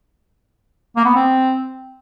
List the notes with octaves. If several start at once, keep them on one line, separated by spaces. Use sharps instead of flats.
A#3
B3
C4